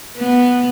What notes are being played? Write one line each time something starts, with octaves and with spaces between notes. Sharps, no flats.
B3